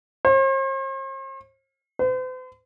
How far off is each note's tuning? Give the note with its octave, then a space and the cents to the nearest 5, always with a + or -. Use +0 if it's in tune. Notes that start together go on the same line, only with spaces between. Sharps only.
C5 +45
C5 -45